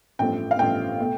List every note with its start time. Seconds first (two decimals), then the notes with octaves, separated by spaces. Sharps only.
0.19 A1 G2 F3 A3 C4 G5
0.51 F5
0.58 A1 G2 F3 A3 C4 G5
1.00 B2 A3